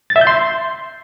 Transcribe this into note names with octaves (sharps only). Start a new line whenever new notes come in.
A6
E5
G6
C6